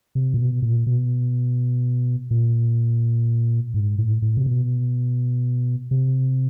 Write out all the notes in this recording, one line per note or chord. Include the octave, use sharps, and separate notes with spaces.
C3
A#2
B2
A#2
B2
A#2
G#2
A2
A2
C3
B2
C3